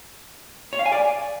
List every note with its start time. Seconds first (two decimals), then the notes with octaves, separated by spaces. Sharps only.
0.73 C#5
0.79 F5
0.86 G#5
0.92 D5